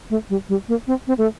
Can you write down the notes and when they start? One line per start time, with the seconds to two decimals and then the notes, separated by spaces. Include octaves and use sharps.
0.10 A3
0.30 G3
0.49 G3
0.68 A#3
0.87 C4
1.07 C4
1.18 A3